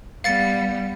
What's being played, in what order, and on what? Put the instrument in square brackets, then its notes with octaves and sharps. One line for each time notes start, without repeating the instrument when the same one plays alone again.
[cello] G3 B3 [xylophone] F5 A6 C#7